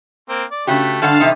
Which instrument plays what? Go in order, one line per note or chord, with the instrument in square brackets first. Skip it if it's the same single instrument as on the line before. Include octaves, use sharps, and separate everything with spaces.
[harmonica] A#3 C4
D5
[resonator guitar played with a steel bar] C#3 F#4 G4 [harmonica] A3
[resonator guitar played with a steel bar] G2 D3 F#5 [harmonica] F5 A5
[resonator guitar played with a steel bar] E2 C3 D#4